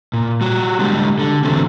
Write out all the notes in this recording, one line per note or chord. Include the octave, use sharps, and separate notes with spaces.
A#2
G3 F#4
D3 F#3 G#3 G4
D3
D3 E3 F#3 A3 C4 C#4